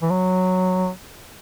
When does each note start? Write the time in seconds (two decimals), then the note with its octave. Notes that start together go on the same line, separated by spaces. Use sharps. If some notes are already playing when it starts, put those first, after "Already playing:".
0.02 E3
0.10 F#3